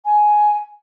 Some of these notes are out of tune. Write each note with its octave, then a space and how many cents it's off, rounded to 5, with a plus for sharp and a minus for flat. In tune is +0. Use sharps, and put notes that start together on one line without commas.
G#5 +10